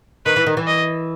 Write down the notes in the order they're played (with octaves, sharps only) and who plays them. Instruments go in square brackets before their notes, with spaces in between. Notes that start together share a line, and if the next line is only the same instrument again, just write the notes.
[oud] D#3 [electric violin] B4
[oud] E3
D#3
E3
[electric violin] D#5